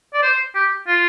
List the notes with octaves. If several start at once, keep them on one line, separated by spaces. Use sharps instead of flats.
D5
C5
G4
F4